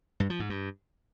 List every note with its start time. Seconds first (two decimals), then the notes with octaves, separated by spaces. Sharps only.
0.20 G2
0.30 F3
0.40 G#2
0.50 G2